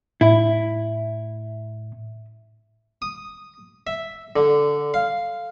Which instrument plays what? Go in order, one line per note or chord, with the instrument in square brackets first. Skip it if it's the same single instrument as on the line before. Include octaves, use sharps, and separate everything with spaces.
[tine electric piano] A2 [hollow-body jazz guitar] E4
[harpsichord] D#6
E5
D3
F5